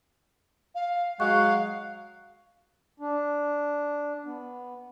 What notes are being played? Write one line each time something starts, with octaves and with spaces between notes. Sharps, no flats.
F5
F#3 G#3 F5 F#5 C#6
D4
B3